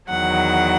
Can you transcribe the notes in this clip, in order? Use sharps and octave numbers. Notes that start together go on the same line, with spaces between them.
E2 D#3 F#3 F#5